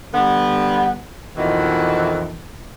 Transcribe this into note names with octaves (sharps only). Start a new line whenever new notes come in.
D3 G3 B3
F2 B2 D#3 E3